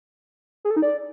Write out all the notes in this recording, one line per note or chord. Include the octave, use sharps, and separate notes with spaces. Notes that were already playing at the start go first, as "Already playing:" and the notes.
G#4
A4
D#4
D5